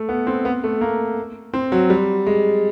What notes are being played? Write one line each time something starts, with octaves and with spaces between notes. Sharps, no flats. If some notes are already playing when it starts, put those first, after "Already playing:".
Already playing: A3
B3
C4
B3
A3
A#3
C4
F#3
G3
G#3